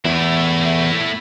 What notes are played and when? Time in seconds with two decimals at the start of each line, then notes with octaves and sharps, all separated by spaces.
0.05 E2 A3 E4